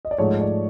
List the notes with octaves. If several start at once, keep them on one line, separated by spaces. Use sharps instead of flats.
D#5
D5
G#2 F3 A3 C#5
D5